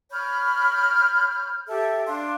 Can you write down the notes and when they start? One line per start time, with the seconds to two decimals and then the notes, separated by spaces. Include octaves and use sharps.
0.11 C#5 B5 F6 G6
1.68 G4 A4 E5
2.06 D4 F5 C6